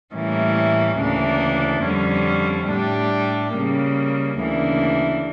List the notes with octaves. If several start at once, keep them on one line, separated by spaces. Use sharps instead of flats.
A2 E3 G3 A#3 C#4
D2 C#3 E3 A#3 D4
F2 D3 G3 C#4
A2 G3 D4 G4
C#3 G3 A#3
D2 C#3 E3 A#3 D4